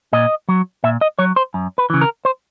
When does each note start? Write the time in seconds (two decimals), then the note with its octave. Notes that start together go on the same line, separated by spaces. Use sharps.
0.13 A#2 D#5
0.49 F#3
0.84 A#2 E5
1.01 D#5
1.19 F#3 C#5
1.36 C5
1.54 F#2
1.78 B4
1.90 C#3 E3
2.01 A#4
2.25 C5